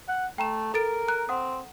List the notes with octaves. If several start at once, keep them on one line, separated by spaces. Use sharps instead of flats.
F#5
A3 G5 A#5 E7
A4 A#4 A6 D7
A#5 F#6
C4 F#5 D#6